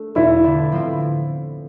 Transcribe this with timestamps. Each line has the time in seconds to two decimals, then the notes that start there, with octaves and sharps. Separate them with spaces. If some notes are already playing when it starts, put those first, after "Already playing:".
Already playing: A3 D4
0.15 E2 B2 B3 E4 F4
0.43 D3 A3 D4
0.72 A2 F3 C4 F4